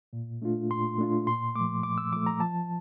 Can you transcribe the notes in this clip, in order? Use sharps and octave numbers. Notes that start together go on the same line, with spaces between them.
A#2
A3 D4 F4
A#2 C6
A3 D4 F4
A#2 C6
F3 A3 D6
A#2 D6
E6
F3 A3 D6
A#5
F3 A5